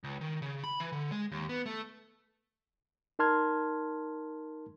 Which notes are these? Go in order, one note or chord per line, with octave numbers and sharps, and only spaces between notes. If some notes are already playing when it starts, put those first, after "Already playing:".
C#2
D#3
C#3
B5
E3
D3
G#3
D#2
B3
A3
D#4 A#4 A5 C6 F6 G#6